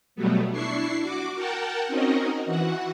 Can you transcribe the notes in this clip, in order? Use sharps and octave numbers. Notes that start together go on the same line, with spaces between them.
B2 F#3 G3 A3 B3
D4 E4 C#6 C7
F#4 D6
A#4 F#5 G5 A5
C4 C#4 D#4 F#4 A#4 D#5
E3 F#4 F#5